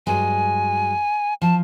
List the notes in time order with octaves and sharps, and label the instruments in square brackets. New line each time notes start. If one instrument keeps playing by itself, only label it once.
[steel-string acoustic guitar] G2 F#3 G#3 [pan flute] G#5
[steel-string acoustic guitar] F3 [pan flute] A5